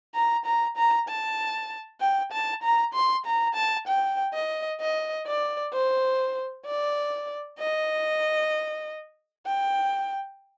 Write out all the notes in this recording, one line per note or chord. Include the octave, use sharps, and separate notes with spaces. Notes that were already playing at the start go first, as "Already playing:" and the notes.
A#5
A#5
A#5
A5
G5
A5
A#5
C6
A#5
A5
G5
D#5
D#5
D5
C5
D5
D#5
G5